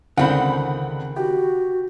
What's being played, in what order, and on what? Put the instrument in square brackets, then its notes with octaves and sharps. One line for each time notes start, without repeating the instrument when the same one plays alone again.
[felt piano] C#2 D3 [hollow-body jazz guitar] D#3 C4 [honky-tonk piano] F#5 B5
[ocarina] F#4 [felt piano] G4